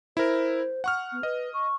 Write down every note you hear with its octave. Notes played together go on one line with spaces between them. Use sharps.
E4 A#4 C5
F#5 C#6 F6
B3
B4 D#5
C#6